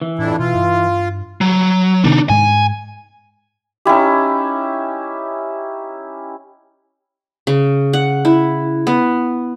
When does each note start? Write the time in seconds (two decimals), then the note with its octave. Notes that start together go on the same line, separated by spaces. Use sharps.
0.02 E3
0.19 F2 A2 D4 E4
0.39 B2 F4
0.55 G2
1.41 F#3
2.04 C3 D#3 B3 D4 D#4
2.29 G#2 G#3 G#5
3.85 C#4 D#4 E4 G4
7.47 C#3
7.93 F#5
8.25 E4
8.87 B3